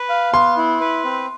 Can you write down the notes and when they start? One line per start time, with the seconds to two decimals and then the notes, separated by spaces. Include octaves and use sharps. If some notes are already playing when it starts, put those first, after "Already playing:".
Already playing: B4
0.09 F5
0.33 B3 C6
0.57 E4
0.81 B4
1.05 C4